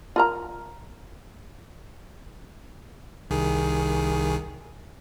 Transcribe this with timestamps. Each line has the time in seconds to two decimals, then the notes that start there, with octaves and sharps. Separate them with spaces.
0.16 F4 A#4 A#5
3.30 C2 D#3 G#4